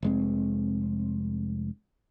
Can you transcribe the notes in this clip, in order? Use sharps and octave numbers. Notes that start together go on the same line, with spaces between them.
F1 G#3 C4